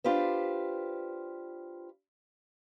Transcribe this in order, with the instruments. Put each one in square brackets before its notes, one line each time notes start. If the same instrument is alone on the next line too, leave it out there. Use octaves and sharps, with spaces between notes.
[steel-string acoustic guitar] D4 F4 G4 B4 C5